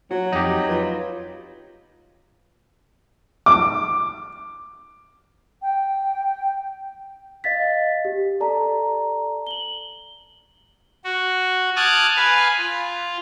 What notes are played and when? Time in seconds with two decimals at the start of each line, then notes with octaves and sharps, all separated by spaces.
0.11 F#3 F#4
0.32 F2 D#4 G4
0.69 F4 B4
3.46 D6
5.62 G5
7.44 D#5 F5 A6 B6
8.05 G4
8.40 A4 D5 A5 A#5
9.47 F#7 G7
11.04 F#4
11.76 G#5 A5 D6 D#6 F6 F#6
12.17 B4 F5 G#5
12.57 F4